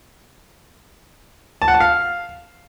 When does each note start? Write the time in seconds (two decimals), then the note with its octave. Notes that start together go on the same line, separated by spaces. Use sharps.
1.62 A5
1.68 F#5
1.74 A5
1.80 F5